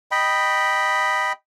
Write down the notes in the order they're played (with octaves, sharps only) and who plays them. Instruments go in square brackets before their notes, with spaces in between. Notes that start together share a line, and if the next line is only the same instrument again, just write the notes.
[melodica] D#5 G5 B5